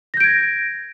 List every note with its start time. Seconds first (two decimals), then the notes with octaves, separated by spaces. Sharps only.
0.14 A#6
0.17 G6
0.20 D7
0.24 G#6